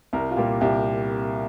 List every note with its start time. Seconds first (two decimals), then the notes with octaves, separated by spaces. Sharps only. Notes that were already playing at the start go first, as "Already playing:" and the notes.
0.13 C2 A#4
0.31 F4
0.37 A#2 G3 A#3 G4
0.61 C2 G4